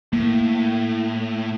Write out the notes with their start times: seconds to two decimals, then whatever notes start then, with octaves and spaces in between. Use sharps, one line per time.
0.13 A2 A#3